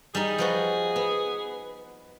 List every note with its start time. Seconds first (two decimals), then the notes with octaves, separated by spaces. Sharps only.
0.15 G3 D#4 G#4
0.38 F3 B3 F#4
0.96 B3